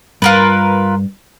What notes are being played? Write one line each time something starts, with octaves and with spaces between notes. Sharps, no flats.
G2 F4 A#4 B4